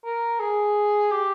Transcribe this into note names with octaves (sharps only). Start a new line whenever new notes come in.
A#4
G#4
G4